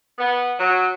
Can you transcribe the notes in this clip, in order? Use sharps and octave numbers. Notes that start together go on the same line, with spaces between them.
B3
F#3